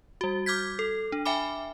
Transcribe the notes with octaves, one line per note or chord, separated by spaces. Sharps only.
G3 F#4
D6 F6 G6 G#6 B6
A4
D4
E5 G5 G#5 B5 D6